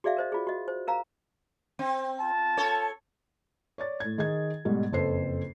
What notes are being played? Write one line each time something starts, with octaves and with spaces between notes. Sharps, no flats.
F#4 G#4 D5 E5 F5
A#4 C5 D#5
F4 G#4
F#4 D#5
C5
A#4 F5 A#5
C4
F4 A5
A4 C#5
C#5 D5 A6
A2 G#6
D#3 G#4 D#5 G#6
G#2 B2 G3 A3
F#1 F2 A4 B4 C5 C7